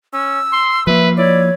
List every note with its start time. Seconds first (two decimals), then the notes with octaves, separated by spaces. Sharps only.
0.13 C#4 E6
0.52 C6
0.87 F3 A#3 B4 E5
1.17 E4 C#5 D5